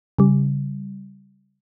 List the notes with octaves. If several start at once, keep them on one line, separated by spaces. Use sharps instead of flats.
C#3 G3